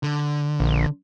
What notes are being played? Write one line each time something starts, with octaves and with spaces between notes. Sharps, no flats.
D3
A#1